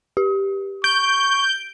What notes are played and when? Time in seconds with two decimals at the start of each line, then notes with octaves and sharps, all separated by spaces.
0.17 G4
0.84 C#6 G6 D7